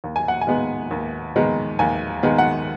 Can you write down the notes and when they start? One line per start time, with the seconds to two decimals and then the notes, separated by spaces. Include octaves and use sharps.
0.04 D#2
0.16 G#5
0.28 F#5
0.41 G#5
0.47 D#3 G#3 B3
0.91 D#2
1.36 D#3 G#3 B3
1.79 D#2 G#5
2.23 D#3 G#3 B3
2.38 F#5